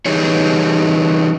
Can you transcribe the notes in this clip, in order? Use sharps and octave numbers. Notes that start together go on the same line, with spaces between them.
E3 G3 D#4 G#4 C#5